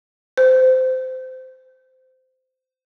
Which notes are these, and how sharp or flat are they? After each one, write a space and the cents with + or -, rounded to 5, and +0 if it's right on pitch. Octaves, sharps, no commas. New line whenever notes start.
C5 -20